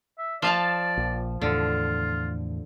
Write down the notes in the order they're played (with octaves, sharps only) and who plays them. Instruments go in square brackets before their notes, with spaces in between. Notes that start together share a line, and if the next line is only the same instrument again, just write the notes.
[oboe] E5
[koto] F3 F5 A5 [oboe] D5
[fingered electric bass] A#1
[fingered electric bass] E2 A2 [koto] D3 [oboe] F4